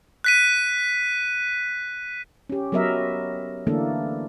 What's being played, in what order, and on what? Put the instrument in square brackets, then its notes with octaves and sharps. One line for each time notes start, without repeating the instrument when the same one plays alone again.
[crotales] F#6 B6 D#7
[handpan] C#4 G4
F#3 B3 A#4 D#5 E5
D3 E3 A3 A#3 D4 A4